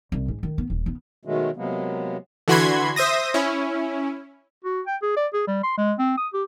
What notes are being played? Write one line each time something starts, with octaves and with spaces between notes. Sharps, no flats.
C2
G#2
D#3
B3
D#1
B3
B2 D#3 F#3 G#3 A3
C3 F#3 G#3 A#3 B3
D3 E3 F#4 B5 C6 G#6
C5 E5 D#6 A#6
C#4 E4
F#4
G5
G#4
D5
G#4
G3
C6
G#3
C4
D#6
G4